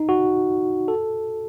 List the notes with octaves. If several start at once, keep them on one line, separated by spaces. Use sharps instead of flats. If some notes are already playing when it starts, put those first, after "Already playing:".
Already playing: D#4
F#4
A4